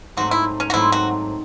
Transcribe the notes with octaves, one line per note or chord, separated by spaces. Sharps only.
G#2 F#3 A3 C4 F#4
E4
C#4
F#4
G#2 F#3 A3 C4 E4
F#4